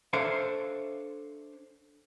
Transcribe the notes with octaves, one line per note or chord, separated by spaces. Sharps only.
D4 A4 C5 C#5 E5 F5